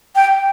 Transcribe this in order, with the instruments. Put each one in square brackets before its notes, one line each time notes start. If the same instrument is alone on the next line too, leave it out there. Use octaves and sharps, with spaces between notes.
[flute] G5